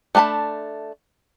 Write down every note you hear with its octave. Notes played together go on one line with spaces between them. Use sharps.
A3 D4 A#4 A5 B5